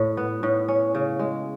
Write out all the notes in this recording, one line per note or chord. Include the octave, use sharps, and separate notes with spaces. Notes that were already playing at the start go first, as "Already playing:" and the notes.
Already playing: A2
B3
A2
C#4
C#3
G#3